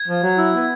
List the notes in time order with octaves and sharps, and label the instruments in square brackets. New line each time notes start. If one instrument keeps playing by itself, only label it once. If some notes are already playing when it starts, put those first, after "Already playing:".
Already playing: [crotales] G#6
[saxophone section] F3
F#3
E4
B3